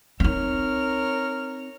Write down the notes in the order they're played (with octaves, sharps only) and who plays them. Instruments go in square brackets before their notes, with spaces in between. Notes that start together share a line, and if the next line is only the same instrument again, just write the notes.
[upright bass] C4 D#4 [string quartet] A#4 C#5 F6